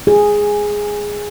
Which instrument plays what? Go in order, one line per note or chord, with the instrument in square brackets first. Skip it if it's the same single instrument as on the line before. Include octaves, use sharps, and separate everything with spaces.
[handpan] G#4